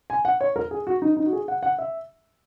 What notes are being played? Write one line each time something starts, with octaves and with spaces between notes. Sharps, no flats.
G#5
F#5
C#5
A#4
G#4
F#4
D#4
D#4
F#4
G#4
F#5
F#5
E5